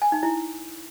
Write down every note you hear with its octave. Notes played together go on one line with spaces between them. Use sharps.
G#5
D#4
E4